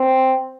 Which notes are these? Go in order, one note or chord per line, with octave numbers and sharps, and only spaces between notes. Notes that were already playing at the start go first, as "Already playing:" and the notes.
Already playing: C4